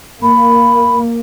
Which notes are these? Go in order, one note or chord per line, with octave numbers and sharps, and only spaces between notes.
A#3 B5